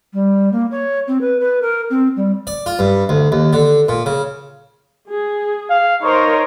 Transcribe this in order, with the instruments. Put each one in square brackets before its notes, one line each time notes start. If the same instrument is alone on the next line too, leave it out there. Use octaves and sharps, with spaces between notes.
[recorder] G3
A#3
C#5
C4
B4
B4
A#4
C4
G3
[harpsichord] D5
F4
G2
D2
D#2
D3
A#2
C#3
[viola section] G#4
[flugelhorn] F5
[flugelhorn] D#4 [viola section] A#4 C5 C#5